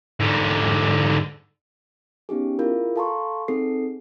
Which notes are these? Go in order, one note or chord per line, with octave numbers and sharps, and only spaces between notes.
G#2 D3
B3 C#4 D#4 G4 G#4
E4 F4 G#4 A#4
A4 F5 A5 A#5 C6 C#6
C4 D#4 G#4 A4 C7